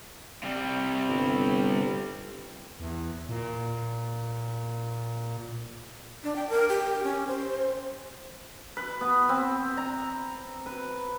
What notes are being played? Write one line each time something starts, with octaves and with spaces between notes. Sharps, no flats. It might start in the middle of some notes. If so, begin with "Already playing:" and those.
C3 G3
G1
E2
A#2
D4
G5
A#4
G4
C#4
C5
B4
B3
C4
A#5
B4